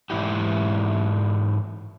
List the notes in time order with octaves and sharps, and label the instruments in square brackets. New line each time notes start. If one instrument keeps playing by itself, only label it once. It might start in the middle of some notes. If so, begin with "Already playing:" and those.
[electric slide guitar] G#2 E3 E4 G4